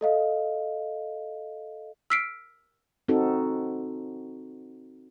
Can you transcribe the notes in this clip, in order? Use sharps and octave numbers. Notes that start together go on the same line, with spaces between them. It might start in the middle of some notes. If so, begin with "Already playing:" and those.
A4 D#5 F5
E6 F6 B6 C7 D7
C4 D#4 F#4 A4